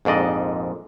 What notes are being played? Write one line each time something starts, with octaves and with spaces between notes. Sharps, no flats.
A#1 F2 G#2 D5 D#5